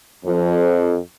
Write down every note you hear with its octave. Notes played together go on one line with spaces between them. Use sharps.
F2